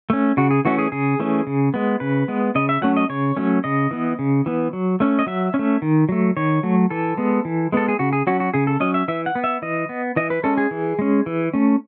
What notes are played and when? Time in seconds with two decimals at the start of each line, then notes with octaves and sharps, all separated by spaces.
0.10 A3 C#4
0.37 C#3 F#4
0.51 G#4
0.65 E3 A3 C#4 F#4
0.79 G#4
0.92 C#3 G#4
1.20 E3 A3 C#4
1.47 C#3
1.74 G#3 B3
2.00 C#3 B4
2.28 G#3 B3
2.55 C#3 D#5
2.69 E5
2.82 F#3 A3 C#4 F#5
2.97 D#5
3.09 C#3 C#5
3.37 F#3 A3 C#4
3.64 C#3 D#5
3.91 E3 B3
4.19 C#3
4.46 E3 B3
4.73 F#3
5.00 A3 C#4
5.19 D#5
5.27 F#3 E5
5.54 C#4
5.59 A3
5.82 D#3
6.09 F#3 A3
6.37 D#3 C#5
6.63 F#3 A3
6.90 E3 A4
7.17 G#3 B3
7.45 E3
7.72 G#3 B3 A4
7.88 G#4
7.99 C#3 F#4
8.13 G#4
8.27 F#3 C#4 F#4
8.40 F#4
8.54 C#3 G#4
8.67 A4
8.80 F#3 C#4 D#5
8.94 E5
9.08 E3 E5
9.26 F#5
9.35 B3
9.44 E5
9.62 E3 D#5
9.89 B3
10.16 E3 D#5
10.30 B4
10.44 G#3 C#4 A4
10.58 G#4
10.71 E3
10.99 G#3 C#4
11.26 E3
11.53 A3 C#4